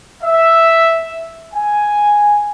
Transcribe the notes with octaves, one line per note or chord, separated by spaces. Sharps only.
E5
G#5